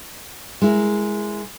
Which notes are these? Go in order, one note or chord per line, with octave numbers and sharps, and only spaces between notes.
G#3 E4 A#4